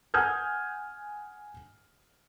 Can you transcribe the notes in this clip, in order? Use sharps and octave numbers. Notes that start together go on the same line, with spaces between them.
F#5 G#5 D#6 F6 G6 G#6